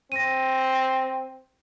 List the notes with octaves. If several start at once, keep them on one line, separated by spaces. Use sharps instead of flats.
C4 A#6 D#7